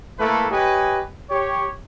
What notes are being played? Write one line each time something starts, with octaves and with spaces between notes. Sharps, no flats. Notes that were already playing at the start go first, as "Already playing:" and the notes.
A3 A#3 E4 A4 B4
G4 B4 C#5 D#5 G#5
G4 C#5